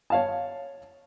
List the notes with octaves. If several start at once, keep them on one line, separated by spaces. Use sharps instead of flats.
C#5 F5 A5